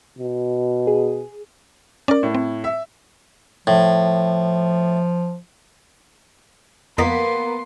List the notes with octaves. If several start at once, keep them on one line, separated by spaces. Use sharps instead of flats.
B2
G#4
C#4 A#4 D5
A2
C4
E5
A2 F3
F2 A#3 B3 D#5 C6 B6